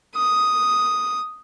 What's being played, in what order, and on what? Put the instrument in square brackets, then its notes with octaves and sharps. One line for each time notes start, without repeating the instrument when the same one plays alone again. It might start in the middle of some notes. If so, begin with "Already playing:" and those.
[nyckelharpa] D#6